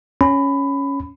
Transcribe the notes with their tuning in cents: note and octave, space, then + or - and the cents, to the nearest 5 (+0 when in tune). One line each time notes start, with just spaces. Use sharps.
C#4 +0 B5 +15